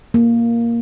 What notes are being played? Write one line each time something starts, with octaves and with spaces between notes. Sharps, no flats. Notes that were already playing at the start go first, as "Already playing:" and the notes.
A#3